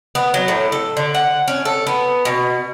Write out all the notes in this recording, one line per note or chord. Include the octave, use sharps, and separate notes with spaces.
B3
F#3
A2
A4
D3
F#5
C#4
A4
B3
B2